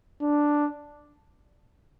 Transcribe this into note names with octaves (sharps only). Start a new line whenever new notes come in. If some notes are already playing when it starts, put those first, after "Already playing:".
D4